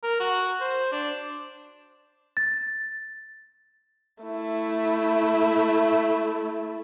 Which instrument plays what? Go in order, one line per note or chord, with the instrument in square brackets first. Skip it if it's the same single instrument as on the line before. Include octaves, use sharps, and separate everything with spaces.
[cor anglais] A#4
F#4
C5
D4
[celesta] A6
[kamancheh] A3 E4